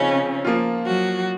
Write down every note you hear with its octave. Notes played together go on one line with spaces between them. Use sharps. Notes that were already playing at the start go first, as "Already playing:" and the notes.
Already playing: C#3 F3 C4 C#4 D#4
F3 A#3 F4
F#3 F#4